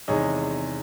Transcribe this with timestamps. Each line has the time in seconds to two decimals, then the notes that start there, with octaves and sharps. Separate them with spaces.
0.08 E2 C3 D#3 G#3 C#5 D#5